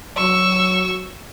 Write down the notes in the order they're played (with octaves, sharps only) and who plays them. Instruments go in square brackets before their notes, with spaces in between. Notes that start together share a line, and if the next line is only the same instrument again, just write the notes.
[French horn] F#3 [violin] C#6 E6